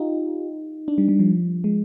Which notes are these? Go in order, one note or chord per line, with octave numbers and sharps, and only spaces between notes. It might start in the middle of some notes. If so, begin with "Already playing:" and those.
Already playing: D#4 F4 G4
D4
G3
G3
F3
G#3